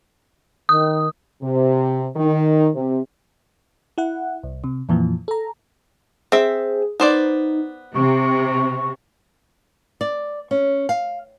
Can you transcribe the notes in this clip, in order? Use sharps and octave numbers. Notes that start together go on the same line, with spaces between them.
D#3 D#6
C3
D#3
C3
E4 F#5
C2
C3
F2 A#2 E3 F3
A4 A#5
C4 G#4 E5
B3 D#4 C5 D5
C3 C#6
D5
C#4
F5